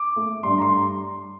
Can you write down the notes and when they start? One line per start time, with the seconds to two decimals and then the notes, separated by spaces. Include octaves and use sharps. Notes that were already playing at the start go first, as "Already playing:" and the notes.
Already playing: D6
0.16 A3
0.43 G2 C6
0.58 A#5
0.62 C6